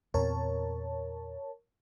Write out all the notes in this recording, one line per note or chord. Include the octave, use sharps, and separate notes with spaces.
E2 A#2 C4 A#4 C#5 A5